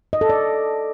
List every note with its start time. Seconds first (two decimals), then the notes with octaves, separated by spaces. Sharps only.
0.13 D#5
0.21 A4
0.29 D5